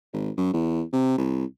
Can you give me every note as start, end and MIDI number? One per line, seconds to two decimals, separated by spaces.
0.13 0.30 32
0.37 0.50 42
0.53 0.83 40
0.93 1.18 48
1.18 1.45 36